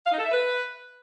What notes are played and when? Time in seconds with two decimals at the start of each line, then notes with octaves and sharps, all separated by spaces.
0.05 F5
0.12 D#4
0.18 A4
0.25 E5
0.31 B4